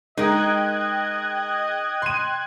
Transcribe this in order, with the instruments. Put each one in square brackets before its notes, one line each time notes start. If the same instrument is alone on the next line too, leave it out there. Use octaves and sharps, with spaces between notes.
[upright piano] G#3 [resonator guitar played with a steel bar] D#4 A#4 [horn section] D#5 [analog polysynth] G5 F#6 G#6
[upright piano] C6 D#7